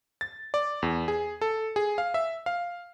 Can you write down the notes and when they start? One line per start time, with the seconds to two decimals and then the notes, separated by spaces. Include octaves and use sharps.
0.21 A6
0.54 D5
0.83 E2
1.08 G#4
1.41 A4
1.76 G#4
1.98 F5
2.14 E5
2.46 F5